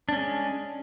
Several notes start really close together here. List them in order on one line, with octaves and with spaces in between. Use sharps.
D4 C#4 G#3